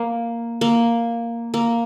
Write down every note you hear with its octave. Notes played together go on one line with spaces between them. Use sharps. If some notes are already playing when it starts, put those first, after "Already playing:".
Already playing: A#3
A#3
A#3